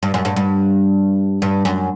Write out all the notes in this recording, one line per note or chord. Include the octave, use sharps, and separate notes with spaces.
G2
F#2
G2
G2
G2
F#2